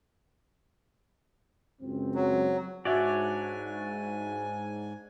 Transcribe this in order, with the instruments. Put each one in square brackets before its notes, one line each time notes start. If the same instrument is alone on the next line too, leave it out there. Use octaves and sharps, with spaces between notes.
[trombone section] C#2 F#2 C4
[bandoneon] F#3
[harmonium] G#2 G#5 [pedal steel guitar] D4 C#5 D5 [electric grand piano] F#4 E5